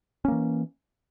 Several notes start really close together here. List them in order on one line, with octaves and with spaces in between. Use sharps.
C#4 A#3 E3